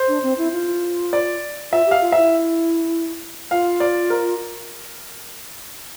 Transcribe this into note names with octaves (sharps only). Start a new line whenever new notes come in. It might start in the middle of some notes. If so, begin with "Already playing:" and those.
Already playing: C5
D4
C4
E4
F4
D5
F4 E5
G4 F5
F4
E4 E5
F4 F5
D5
A#4